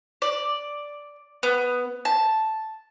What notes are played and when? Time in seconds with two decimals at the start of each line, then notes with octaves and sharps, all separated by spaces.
0.22 D5
1.43 B3
2.05 A5